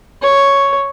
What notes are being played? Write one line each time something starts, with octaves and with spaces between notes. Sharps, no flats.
C#5